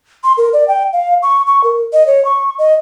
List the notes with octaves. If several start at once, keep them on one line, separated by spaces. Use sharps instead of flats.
C6
A#4
D5
G5
F5
C#6
C#6
A#4
D#5
C#5
C#6
D#5